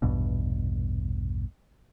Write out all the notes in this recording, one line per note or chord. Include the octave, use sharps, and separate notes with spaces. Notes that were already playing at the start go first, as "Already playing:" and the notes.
A#1 E2 G2 B2